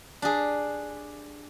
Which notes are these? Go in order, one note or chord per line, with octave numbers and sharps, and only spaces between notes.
D4 G4 G#4